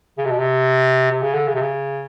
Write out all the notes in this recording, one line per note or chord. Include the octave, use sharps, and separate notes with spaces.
C#3
C3
B2
C3
C3
C#3
D3
C#3
C3
C#3